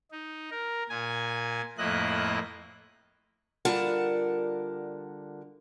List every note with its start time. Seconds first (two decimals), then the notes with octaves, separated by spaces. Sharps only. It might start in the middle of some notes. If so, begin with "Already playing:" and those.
0.11 D#4
0.51 A#4
0.89 A#2 G#5
1.78 F2 A2 A#3 E4 D#5 F#6
3.65 D3 G3 F4 A#4 F#5 A5